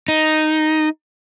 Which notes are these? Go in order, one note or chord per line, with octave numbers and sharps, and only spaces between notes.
D#4